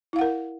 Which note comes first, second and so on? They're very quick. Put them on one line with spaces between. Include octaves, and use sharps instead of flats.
E4 F5 F#5 A#4